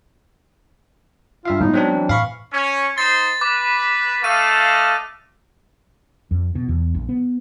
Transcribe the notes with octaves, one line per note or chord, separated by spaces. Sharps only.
G2 F4 E5 F5
A2 G3 G#3 B3 D#4
F#3 C4 D4
E3
A2 F5 B5 C#6
C#4
D#4 C5 C6 A6
B4 D6
A3 D#5 F5 D#7
F2
B2
E2
A#1
B3